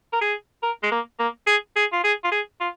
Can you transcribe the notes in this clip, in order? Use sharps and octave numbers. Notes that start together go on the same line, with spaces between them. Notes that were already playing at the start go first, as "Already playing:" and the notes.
A#4
G#4
A#4
G#3
A#3
A#3
G#4
G#4
F4
G#4
F4
G#4
F4